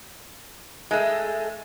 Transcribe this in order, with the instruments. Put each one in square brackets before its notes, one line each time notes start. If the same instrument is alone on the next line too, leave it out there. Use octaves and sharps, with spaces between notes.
[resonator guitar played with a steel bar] G#3 A3